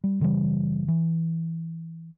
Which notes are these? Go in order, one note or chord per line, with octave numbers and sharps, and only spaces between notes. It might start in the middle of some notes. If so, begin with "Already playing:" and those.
G3
F#1 C#3 E3 G3
E3